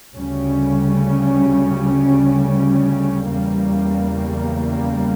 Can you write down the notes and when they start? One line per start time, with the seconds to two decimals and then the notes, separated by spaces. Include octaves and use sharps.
0.14 D2 C#3 G3 C#4
3.28 E2 C#3 G3 A#3